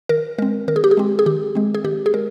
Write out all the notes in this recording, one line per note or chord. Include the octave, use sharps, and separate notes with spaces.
D#3 A#4
G#3 C4 A#4
D#3 A#4
G#4
G4
G#4
G#3 C4
G#4
D#3 G4
G#3 C4
G#4
D#3 G4
G#4
G#3 A#4